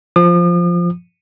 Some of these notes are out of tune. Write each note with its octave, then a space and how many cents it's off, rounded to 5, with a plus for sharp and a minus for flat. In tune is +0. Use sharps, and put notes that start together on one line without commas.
F3 +0 D#6 -45